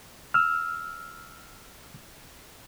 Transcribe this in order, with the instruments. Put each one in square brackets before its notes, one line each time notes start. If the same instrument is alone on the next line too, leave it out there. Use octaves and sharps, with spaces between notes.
[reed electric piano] E6 F6